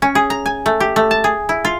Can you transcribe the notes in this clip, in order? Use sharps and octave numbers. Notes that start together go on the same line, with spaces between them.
C#4
G#4
A#5
G#5
A3
G4
A3
A5
G#4
E4
F4